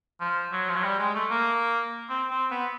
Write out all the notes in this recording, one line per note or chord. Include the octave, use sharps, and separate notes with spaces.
F3
F#3
F3
F#3
G3
G#3
A3
A#3
C4
C4
B3